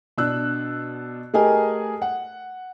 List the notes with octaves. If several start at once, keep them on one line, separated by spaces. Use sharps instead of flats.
B2 D4 E6 F#6
A3 G4 G#4 A#4 D#5 G#5
F#5